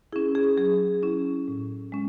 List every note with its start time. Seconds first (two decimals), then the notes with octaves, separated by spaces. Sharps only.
0.13 C#4 E4 G#4
0.35 G#4
0.57 F#3 G#4
1.03 C#4 E4
1.48 A2
1.92 G#3 C#4